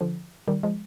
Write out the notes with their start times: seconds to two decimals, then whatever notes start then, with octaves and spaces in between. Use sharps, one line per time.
0.01 D3 F3
0.48 D#3 G3
0.63 F3 G#3